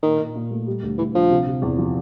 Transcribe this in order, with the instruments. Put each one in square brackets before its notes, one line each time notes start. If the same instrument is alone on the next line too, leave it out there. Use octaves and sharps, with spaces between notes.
[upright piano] A#2 [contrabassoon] D#3
[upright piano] A#2
A#2
A3
G3
D2
[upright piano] D2 [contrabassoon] E3
[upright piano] D3 [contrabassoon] F3
[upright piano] C3
C3
E2
F3